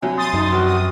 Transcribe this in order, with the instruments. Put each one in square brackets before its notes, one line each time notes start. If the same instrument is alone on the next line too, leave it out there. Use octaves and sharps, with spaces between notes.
[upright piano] C2 F#3 [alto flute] G#5
[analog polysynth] C6 D#6 A6
[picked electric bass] F#2 [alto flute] D#4
[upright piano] F1 [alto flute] F#4
[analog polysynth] D#6